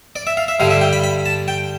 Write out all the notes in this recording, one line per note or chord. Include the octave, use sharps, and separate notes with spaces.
D5
E5
F5
E5
G2 D3 G3 F5
E5
G5
B5
B5
A5
G5